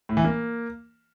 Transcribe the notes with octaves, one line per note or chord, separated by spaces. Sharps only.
A2
E3
A#3